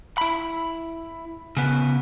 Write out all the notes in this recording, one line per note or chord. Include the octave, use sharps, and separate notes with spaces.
E4 B5
C#3 B3